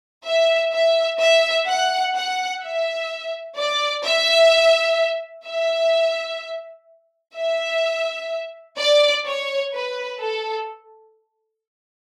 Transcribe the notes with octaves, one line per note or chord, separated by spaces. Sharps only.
E5
E5
E5
F#5
F#5
E5
D5
E5
E5
E5
D5
C#5
B4
A4